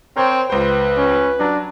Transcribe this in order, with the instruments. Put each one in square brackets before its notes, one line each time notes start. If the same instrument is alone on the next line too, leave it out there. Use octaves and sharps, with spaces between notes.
[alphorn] C4 [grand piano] A#4 C5 C#5
[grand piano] C#2 C5 [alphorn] B4
[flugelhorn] C#4
[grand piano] F#3 [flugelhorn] D4